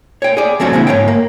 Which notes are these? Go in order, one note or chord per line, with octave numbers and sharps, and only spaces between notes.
C#5 G5
G#4 D5
F3 A3 C4 C#4 F#4 A4
D3 G#3 A#3 C4 E4
G#2 C#5 F5 G5
A#3